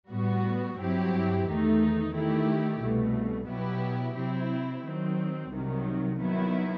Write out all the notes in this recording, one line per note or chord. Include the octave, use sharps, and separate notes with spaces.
A2 G3 B3 F#4
G2 F#3 C4 E4 G4
E2 D#3 A3 D#4
D#3 A3 E4 G4
C2 B2 A3
B2 F#3 B3 E4 G4
C3 F#3 C4 E4
D#3 F#3 C4
C2 C3 D#3 F#3
D#3 F#3 B3 E4